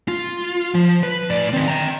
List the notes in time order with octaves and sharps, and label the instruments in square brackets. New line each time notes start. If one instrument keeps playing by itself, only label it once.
[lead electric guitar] F4
F3
B4
A2 D5
D#3 C4
G5 A#5